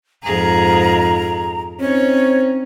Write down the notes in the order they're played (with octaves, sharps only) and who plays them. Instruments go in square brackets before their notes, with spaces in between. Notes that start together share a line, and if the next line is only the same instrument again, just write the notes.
[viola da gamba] F2 G#2 G#4 [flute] A#5
[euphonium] C4 [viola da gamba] C#4 D#4 [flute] C#5